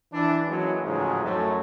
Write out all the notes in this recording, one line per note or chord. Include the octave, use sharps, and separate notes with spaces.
E3 D4
E3 F#3 G#3 A#3 C#4
A1 G#2 C#3 F3 F#3 G#3
F#2 F#3 A3